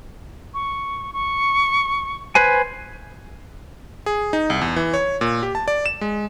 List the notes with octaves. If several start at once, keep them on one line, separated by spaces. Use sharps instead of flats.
C#6
C#6
B4 C5 G#5 G#6
G#4
D#4
C2
E2
E3
C#5
A#2
G4
A5
D5
E7
G#3